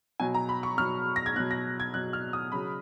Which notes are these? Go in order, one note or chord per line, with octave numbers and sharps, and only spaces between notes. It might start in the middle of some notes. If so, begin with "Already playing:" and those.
B2 F#3 G#5
A#5
B5
C#6
B2 F#3 F6
A#6
G#6
B2 F#3 F#6
A#6
G#6
B2 F#3 F#6
F6
D#6
C#3 F#3 B5